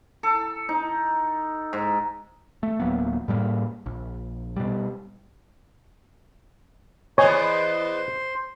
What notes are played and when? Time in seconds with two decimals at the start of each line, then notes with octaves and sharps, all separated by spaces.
0.23 A4
0.69 D#4
1.73 G#2
2.63 A3
2.80 D1 F#3 A#3 B3
3.28 A2 G3 A3 A#3
3.86 A#1
4.56 B2 G3
7.18 E2 B3 C5 C#5 D#5 G#5 C6